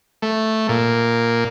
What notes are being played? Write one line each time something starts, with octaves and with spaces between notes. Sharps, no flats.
A3
A#2